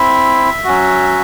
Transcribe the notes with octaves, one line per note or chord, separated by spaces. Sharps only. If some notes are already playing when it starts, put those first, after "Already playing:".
Already playing: C4 E4 E5
F#3 C#4 F#4